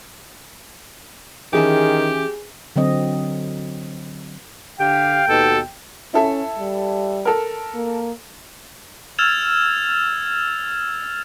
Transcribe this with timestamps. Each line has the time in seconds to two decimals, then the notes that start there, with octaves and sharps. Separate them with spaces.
1.53 D#3 E3 C#4 G4 G#4 G#5 A5
2.76 D3 F#3 C4 D#5
4.80 D3 G4 F5 G5
5.28 D#2 B2 A4
6.14 C#4 E4 A4 E5
6.59 G3
7.25 A4 A#4
7.75 A#3
9.19 E6 F6 G#6 A6 E7 F7